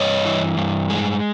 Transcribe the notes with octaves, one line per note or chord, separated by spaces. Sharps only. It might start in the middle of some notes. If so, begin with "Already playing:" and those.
Already playing: G2 C#5 D#5
E3
G2
G#3